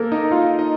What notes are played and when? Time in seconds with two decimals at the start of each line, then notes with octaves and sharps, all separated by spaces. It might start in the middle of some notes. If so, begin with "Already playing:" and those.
Already playing: A#3 A4 A#4
0.12 D#4 D#5
0.32 F4 F5
0.59 D#4 D#5